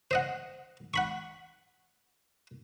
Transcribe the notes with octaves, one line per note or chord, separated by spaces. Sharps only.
C5 D#5 F#5
F#5 B5 C#6